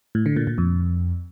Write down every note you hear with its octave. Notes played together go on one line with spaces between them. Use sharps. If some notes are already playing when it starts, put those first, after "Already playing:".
A2
D3
A#2
A#2
F2